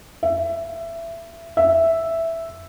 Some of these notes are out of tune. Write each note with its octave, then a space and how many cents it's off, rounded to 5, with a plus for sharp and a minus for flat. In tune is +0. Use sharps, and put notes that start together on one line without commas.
E5 +20
E5 +0